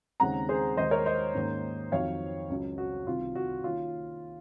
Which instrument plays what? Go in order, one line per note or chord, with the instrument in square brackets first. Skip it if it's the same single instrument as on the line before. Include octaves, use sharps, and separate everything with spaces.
[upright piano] D#2 C#3 G#3 C4 F#5 A#5
G#4 C5
D#2 D#3 G#3 C5 D#5
A#4 C#5
C5 D#5
G#2 D#3 A#3 C#4
F2 D#3 F#3 C#5 F5
C#2 C#3 F#3
F#4
C2 C3 D#3 F4
F#4
D#3 A#3 C#4 F4